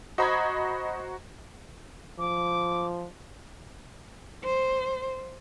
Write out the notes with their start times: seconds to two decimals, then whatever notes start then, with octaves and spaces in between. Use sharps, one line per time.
0.18 F#4 C5 D#5 A#5 B5 G#6
2.19 F3 D6
4.44 C5